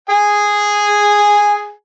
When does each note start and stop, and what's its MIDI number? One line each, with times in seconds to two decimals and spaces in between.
0.10 1.71 68
0.10 1.71 80